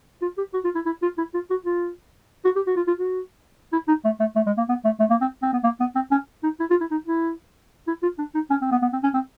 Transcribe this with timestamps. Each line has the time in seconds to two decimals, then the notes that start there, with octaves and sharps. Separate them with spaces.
0.22 F4
0.38 G4
0.54 F#4
0.64 F4
0.75 E4
0.86 E4
1.02 F4
1.18 E4
1.34 F4
1.50 F#4
1.65 F4
2.45 F#4
2.56 G4
2.67 F#4
2.76 F4
2.87 F4
2.98 F#4
3.73 E4
3.88 D#4
4.05 A3
4.20 A3
4.36 A3
4.46 G#3
4.57 A#3
4.69 B3
4.85 A3
5.00 A3
5.10 A#3
5.21 C4
5.42 C4
5.53 B3
5.64 A#3
5.80 B3
5.96 C4
6.11 C#4
6.43 D#4
6.60 E4
6.70 F4
6.81 E4
6.91 D#4
7.07 E4
7.87 E4
8.03 F4
8.18 D4
8.34 D#4
8.50 C#4
8.62 C4
8.71 B3
8.82 B3
8.93 C4
9.03 C#4
9.14 C4